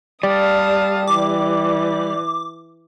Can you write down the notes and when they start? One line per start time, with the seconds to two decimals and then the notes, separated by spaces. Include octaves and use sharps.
0.23 G3 D5 F5 A5 D#6
1.07 E3 D6